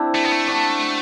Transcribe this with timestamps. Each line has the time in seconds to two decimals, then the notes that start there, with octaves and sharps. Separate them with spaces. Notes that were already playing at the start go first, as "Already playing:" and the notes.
Already playing: C4 D4 E4
0.15 A3
0.24 B3
0.32 A3
0.48 D4 F#4